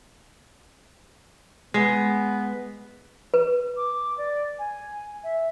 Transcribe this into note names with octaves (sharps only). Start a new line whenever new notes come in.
G#3 B3
B4
D6
D5
G#5
E5